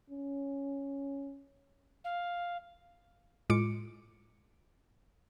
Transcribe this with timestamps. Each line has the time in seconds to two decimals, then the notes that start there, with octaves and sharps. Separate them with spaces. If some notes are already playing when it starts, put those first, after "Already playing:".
0.11 C#4
2.04 F5
3.50 A2 G#3 F4 D6 C#7 D7